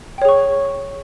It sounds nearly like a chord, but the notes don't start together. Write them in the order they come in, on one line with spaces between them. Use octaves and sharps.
G5 C#5 G#4 C#6